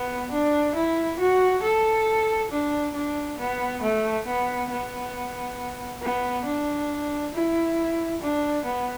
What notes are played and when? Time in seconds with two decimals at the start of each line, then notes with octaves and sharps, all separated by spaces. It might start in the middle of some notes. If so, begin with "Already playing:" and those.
Already playing: B3
0.32 D4
0.75 E4
1.19 F#4
1.63 A4
2.51 D4
2.94 D4
3.39 B3
3.82 A3
4.27 B3
4.71 B3
6.02 B3
6.45 D4
7.34 E4
8.21 D4
8.65 B3